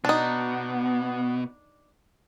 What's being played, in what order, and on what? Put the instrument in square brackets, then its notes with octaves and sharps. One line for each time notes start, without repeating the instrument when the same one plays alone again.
[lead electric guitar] B2 [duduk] B3 [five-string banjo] D4 D#4